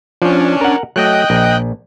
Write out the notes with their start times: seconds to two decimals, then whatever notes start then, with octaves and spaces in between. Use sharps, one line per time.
0.22 F3 C#4 D4
0.61 A#4 F#5
0.96 F#3 A3 D#5 G5 F#6
1.30 A#1